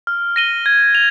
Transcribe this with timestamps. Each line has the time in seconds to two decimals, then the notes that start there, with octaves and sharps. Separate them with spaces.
0.07 F6
0.36 A#6 D#7 G7
0.66 G#6
0.95 F7